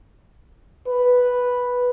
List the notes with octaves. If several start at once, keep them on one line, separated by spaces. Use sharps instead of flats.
B4